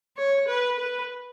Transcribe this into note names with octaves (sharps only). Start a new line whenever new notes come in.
C#5
B4
B4